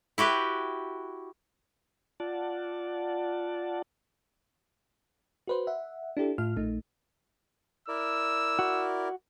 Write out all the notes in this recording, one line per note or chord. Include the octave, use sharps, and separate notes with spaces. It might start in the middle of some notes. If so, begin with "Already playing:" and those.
E4 F#4 G4 B4
F4 D5 F#5 A5
F#4 B4 C5
E5 F#5
D4 E4 G4 A4
A2 F4 F6
A#1 A3 D#4
E4 A#4 D5 E6
F#4